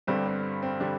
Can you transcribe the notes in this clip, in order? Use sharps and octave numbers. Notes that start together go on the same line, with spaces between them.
G1 G2 D3 G3 C4
C4
C4
D3 G3 D4